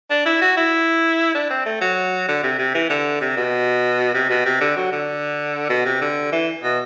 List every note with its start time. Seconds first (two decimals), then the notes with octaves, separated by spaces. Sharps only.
0.10 D4
0.25 E4
0.41 F#4
0.57 E4
1.34 D4
1.50 C4
1.66 A3
1.81 F#3
2.28 D3
2.43 C3
2.59 C3
2.74 E3
2.89 D3
3.21 C3
3.36 B2
4.14 C3
4.30 B2
4.46 C3
4.61 D3
4.77 F#3
4.92 D3
5.69 B2
5.85 C3
6.01 D3
6.32 E3
6.63 B2